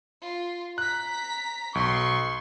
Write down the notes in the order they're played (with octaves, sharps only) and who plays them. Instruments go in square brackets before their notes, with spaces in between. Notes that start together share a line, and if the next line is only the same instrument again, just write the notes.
[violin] F4
[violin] A#5 B6 [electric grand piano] F#6
[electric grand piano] B1 [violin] C6 [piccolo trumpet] C#6